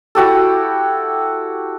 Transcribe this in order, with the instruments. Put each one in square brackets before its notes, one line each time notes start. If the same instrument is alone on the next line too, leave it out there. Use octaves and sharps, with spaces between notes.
[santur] E4 F#4 G4 A4